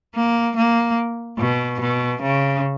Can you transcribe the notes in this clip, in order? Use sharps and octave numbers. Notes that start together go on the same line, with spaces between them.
A#3
A#3
B2
B2
C#3